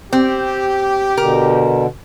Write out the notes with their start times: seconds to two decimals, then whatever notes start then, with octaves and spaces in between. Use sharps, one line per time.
0.13 C4 G4
1.17 B2 D3 A#4